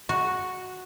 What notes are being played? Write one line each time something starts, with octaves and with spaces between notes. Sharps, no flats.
F#4